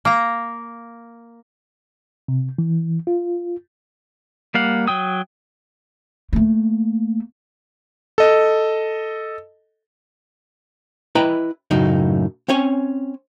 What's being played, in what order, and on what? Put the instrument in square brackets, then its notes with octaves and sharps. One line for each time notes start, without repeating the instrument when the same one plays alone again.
[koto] A#3 A#5
[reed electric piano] C3
E3
F4
[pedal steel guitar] G3 A#3 F5 F#5
F#3 G5 D#6
[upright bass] A3 A#3
[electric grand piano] A4 D#5
[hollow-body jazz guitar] E4 B4 D#5 G5 A#5 B5
F#2 A2 C#3 D#4
C4 C#4 C#5 G#5